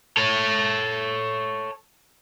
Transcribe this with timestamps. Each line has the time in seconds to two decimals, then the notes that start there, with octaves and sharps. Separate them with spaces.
0.17 A4 C#5